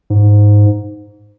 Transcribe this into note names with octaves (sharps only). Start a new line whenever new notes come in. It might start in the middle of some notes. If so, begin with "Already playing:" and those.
G#2